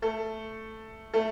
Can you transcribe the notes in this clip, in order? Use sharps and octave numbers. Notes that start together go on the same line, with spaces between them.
A3 A4
A3 A4